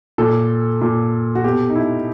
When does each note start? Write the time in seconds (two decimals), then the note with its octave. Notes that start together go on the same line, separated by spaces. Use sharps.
0.18 A#2 A4
0.81 A#2
1.35 F#4
1.44 B2 G4
1.69 D#4
1.75 E4